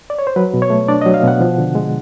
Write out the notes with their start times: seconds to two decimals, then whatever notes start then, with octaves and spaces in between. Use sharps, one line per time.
0.10 D5
0.19 C#5
0.27 C5
0.36 F#3 B4
0.54 B2
0.62 C#5
0.70 A3
0.88 D4 D5
1.01 F#3 D#5
1.14 F5
1.23 B2 F#5
1.41 F3
1.58 D3
1.75 G#3